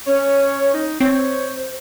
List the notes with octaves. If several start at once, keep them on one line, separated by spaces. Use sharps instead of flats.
C#4 C#5
D#4
C4 C5 C#5